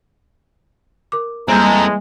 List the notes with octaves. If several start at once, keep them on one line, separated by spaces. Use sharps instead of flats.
A#4 D6
E3 G3 G#3 A#3 C4 A4 A#5